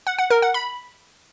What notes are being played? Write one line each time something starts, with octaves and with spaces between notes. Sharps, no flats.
F#5
F#5
A#4
F#5
B5